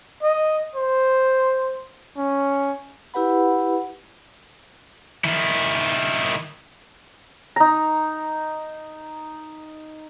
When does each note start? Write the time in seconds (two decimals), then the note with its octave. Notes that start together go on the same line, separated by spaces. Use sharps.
0.23 D#5
0.75 C5
2.17 C#4
3.14 E4 G4 B4 F#5 B5
5.24 D#3 E4
7.56 D#4 A#5